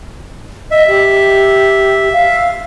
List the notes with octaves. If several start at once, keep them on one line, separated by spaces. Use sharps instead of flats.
D#5 E5
G4
F5